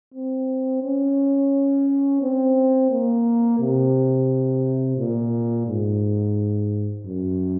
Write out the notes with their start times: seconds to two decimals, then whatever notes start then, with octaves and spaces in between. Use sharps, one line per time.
0.14 C4
0.83 C#4
2.22 C4
2.90 A#3
3.60 C3
4.98 A#2
5.67 G#2
7.05 F#2